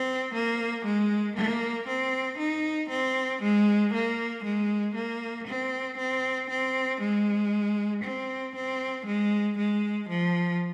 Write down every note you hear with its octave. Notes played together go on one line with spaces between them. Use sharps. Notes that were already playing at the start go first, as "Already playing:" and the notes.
Already playing: C4
A#3
G#3
A#3
C4
D#4
C4
G#3
A#3
G#3
A#3
C4
C4
C4
G#3
C4
C4
G#3
G#3
F3